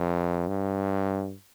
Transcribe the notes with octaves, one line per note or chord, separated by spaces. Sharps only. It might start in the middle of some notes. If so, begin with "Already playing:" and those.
Already playing: F2
G2